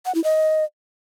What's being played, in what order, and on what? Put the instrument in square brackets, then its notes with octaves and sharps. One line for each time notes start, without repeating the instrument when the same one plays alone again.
[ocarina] F#5
E4
D#5